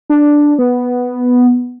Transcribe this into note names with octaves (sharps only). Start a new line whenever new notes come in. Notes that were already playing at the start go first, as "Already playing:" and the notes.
D4
B3